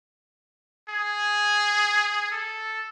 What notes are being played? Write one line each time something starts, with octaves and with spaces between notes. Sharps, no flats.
G#4
A4